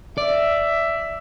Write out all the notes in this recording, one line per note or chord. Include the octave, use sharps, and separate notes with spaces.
D5 E5